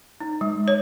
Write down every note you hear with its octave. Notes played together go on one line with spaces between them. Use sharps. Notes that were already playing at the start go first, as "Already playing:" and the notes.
D#4
G#3
C#5